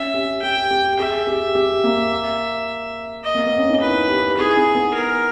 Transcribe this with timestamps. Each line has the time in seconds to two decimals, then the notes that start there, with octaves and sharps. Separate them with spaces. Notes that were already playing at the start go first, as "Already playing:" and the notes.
Already playing: C#4 E5
0.14 G4
0.42 G4 G5
0.71 G4
0.99 G#4 E5
1.27 G4
1.55 G4
1.84 A#3
3.24 D#5
3.35 A#3
3.46 B3
3.58 C#4
3.69 D#4
3.81 E4 B4
4.09 G4
4.38 E4 G#4
4.57 D#4
4.75 B3
4.94 A#4